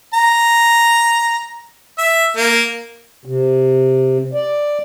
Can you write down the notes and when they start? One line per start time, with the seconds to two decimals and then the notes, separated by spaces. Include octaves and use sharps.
0.14 A#5
1.98 E5
2.37 A#3
3.25 C3
4.34 D5